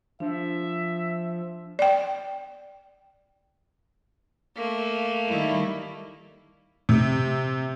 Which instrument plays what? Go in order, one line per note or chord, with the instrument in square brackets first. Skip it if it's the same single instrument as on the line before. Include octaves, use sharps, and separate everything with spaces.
[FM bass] F3 [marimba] D4 [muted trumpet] E5
[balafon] D5 G5
[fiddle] A3 A#3
[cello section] D#3 G3 E4
[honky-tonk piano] C3